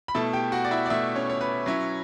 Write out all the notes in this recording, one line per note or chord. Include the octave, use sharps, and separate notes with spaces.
B5
B2 A3 E4 A4 A5
G4 G5
F#4 F#5
D5
E4 E5
D5
B2 A3 E4 E5
C#4 C#5
C#5
B4
F#3 C#4 E4